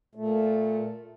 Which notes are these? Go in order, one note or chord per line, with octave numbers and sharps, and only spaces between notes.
A#2 A3